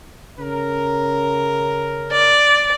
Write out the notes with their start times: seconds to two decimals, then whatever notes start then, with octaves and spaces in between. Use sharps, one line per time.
0.39 C#3 C#4 A#4
2.12 D5